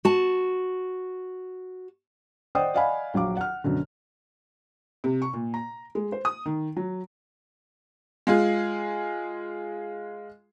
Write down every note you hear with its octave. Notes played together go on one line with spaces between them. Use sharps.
F#4 A5
C5 D5 D#5 F#5 G5 D#6
D5 D#5 F5 F#5 G#5 B5
A#1 F#3 F5 D6
F#5 F6
F#2 B2 D3
C3
C#6
A#2
A#5
G#3
C5
D#6
D#3
F#3
G#3 F4 G#4